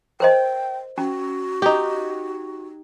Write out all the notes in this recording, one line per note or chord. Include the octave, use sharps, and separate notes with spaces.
A#4 C5 D#5 G5
C#4 F#4
D#4 G4